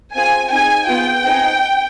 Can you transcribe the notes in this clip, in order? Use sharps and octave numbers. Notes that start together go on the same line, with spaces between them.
C4 F4 G#4 G#5
C4 D#4 G#4 G#5
B3 F4 G#4 G5
C4 D#4 G#4